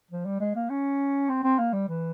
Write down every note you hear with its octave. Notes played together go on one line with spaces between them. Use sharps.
F3
G3
G#3
A#3
C#4
C4
C4
A#3
G3
E3